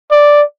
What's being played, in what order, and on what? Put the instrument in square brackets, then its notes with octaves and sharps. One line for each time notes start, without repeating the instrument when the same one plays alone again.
[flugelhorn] D5